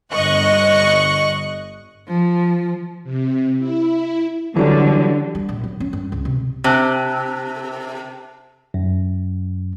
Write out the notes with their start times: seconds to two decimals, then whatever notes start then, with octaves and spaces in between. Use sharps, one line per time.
0.12 G1 D#5 C#6 F#6
2.07 F3
3.04 C3
3.59 E4
4.57 D3 E3 F#3 G3
5.35 G3
5.49 A#1
5.64 F#3
5.80 C#4
5.93 G2
6.12 C#2
6.25 C3
6.64 C3 C5 A5 F#6
8.74 F#2